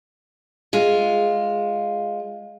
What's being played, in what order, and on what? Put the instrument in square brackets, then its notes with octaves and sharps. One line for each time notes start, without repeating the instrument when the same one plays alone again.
[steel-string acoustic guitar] G#3 F4